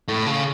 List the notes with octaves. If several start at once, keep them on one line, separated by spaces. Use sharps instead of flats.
A2
C#3